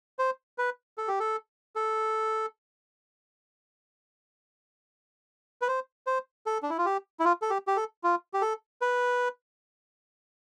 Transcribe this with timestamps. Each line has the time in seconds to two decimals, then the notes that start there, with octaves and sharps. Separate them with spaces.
0.19 C5
0.58 B4
0.98 A4
1.08 G4
1.20 A4
1.76 A4
5.62 B4
5.68 C5
6.07 C5
6.46 A4
6.62 D4
6.70 E4
6.78 F4
6.85 G4
7.20 E4
7.25 F4
7.42 A4
7.50 G4
7.67 G4
7.76 A4
8.04 F4
8.34 G4
8.42 A4
8.81 B4